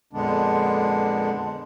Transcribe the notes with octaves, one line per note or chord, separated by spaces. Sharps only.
F2 A#2 D3 G#3 B3 D4